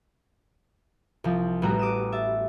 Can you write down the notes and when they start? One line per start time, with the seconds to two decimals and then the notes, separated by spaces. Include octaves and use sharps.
1.24 C2 F3
1.62 A1 G3 B3 F#4 A#5
1.79 D6 D#6 D#7 E7
2.12 E5 A6